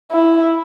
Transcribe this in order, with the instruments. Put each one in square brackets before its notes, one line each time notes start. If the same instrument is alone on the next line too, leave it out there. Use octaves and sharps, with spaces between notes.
[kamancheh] E4